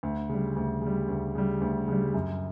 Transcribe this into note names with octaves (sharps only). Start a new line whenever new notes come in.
D2
C#3 G3
D2
C#3 G3
D2
C#3 G3
D2
C#3 G3
F#2